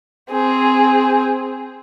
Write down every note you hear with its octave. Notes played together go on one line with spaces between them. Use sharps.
C4 G#4